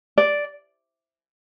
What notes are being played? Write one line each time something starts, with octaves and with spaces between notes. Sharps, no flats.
D5